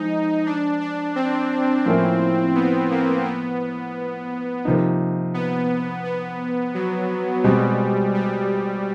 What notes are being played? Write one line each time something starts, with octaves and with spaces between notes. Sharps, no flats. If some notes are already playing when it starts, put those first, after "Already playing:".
Already playing: F3 G#3 D#4
D4
D4
C4
A2 F3 A#3 C#4 E4
B3
A#3
B3
C3 F3 A#3 D#4
B3
B3
F#3
B2 G3 G#3 C4
G3